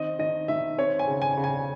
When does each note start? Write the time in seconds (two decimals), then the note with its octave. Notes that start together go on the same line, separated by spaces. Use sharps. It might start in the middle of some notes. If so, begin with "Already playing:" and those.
Already playing: D#3 C4 D#5
0.19 D#3 D#5
0.48 D#3 E5
0.78 C4 C#5
0.99 G#5
1.07 C#3
1.22 G#5
1.37 C#3
1.44 G#5